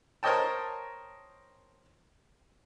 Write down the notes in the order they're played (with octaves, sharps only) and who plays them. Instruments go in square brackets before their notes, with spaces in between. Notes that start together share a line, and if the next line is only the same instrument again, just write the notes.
[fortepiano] A#4 C5 C#5 D#5 G5 A5